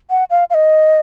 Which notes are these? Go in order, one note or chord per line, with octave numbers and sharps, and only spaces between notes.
F#5
F5
F5
D#5